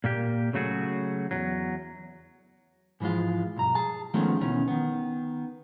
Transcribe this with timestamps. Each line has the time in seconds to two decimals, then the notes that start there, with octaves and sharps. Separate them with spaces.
0.04 A#2 A#3 G4
0.53 C#3 F#3 A3 F#4 G#4
1.31 E2 G#2 F#3
3.00 G#2 E3 F3 G#3 F4
3.56 B1 G2 A#5
3.75 G#4 A5
4.14 D#3 F3 G#3 A3 B3 C#4
4.41 D2 B2 D#3 E3 C#4
4.68 D#3 B3